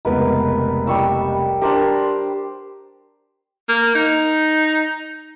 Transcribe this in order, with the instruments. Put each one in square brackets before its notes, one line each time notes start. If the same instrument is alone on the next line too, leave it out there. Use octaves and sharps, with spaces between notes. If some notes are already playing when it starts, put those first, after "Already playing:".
[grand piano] F1 C#2 B3 [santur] A#4 B4
[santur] G3 C#6 E6
[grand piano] D4 A#4 A#5 [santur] G4 C5
[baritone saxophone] A#3
D#4